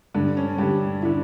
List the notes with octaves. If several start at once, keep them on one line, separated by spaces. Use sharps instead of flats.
G2 D3
C#4
G2 D3 G4
D3 E4